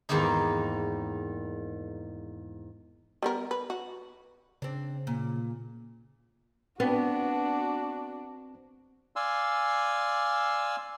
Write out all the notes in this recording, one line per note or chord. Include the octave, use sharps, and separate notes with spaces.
E2 G#2 D#3 A#3 D#4
G3 B3 A#4
B4
F#4
C#3 C4 D4
A#2
B3 C4 D4 F#4
D5 F5 G#5 C6 E6